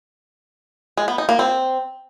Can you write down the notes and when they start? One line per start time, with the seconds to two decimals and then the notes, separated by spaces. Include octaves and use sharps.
0.97 G#3
1.08 B3
1.18 D#4
1.29 A#3
1.39 C4